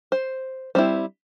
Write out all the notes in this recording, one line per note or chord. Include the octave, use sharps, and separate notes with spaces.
C5
G3 C4 E4 C5